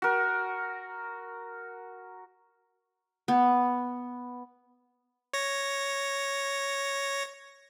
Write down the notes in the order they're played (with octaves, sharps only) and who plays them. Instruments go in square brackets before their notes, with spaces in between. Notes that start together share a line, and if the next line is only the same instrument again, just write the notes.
[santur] F#4 A#4
[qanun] B3
[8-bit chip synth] C#5 A#6